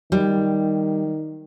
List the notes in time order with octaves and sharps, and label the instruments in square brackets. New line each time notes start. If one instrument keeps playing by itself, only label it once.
[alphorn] D#3 [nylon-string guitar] G3